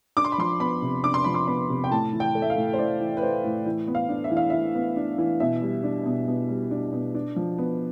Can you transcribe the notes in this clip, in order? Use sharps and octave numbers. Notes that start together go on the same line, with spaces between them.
D4 D6
C6
B5
F3 C6
B3 B5
C3
D4 D6
C6
F3 B5
C6
B3 B5
C3
G5
A2 A5
E3
G5
A3
E5
F5
A2
C5
A2 D5
E3
B4
A3 C5
A2
E3
B3
F5
D4
E5
E3
F5
E3 E5
B3
D4
E3
B2 E5
G3
D4
B2
B2
G3
D4
B2
D4
F3
B3